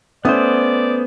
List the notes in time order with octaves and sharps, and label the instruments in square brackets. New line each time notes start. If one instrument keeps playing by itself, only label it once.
[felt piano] A3 C#4 D#6 [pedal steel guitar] B3 C5 [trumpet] D5